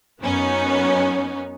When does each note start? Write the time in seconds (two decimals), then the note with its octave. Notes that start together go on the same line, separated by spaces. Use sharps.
0.21 F#2 B3 C#4 D#4